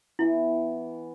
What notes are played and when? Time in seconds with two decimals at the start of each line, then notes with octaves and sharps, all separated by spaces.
0.19 E3 B3 E4